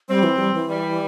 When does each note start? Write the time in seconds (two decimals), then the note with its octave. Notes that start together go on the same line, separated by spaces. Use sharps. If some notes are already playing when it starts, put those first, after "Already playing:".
0.08 G3 C4
0.23 E3
0.38 G3
0.54 E3
0.69 G3